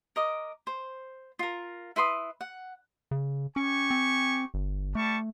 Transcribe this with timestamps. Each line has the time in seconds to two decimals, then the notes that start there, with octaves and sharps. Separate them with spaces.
0.16 A#4 D#5 D6
0.67 C5
1.39 F4 A#4
1.96 E4 B4 C6 D#6
2.41 F#5
3.11 C#3
3.56 C#4 G4 G#5 C#6
3.91 C4
4.54 G1
4.95 G3 A3 A5 C#6